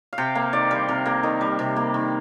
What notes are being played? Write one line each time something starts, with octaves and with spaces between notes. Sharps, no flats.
F5
C3 G5
A#3 F5
D#3 D5
G3 C5
C3 A#4
A#3
D#3 D#5
G3
C3
A#3
D#3